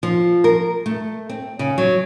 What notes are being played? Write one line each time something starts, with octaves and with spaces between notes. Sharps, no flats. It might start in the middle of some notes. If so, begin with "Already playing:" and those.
F3
A#4
A3
C4
C#3
F#3